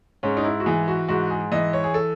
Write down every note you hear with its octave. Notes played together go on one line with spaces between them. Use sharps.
G#2 C#4
D#4
E4
F#4
E3 G#4
F#4
G#2 F#4
G#4
E3 D#5
C#5
G#4
A4